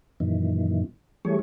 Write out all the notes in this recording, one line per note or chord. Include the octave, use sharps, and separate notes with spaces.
F#2 A#2 D#3 E3
E3 G3 A3 G#4 C#5